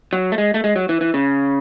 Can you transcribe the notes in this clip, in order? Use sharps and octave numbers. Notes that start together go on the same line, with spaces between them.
F#3
A3
G#3
A3
G#3
F#3
E3
E3
C#3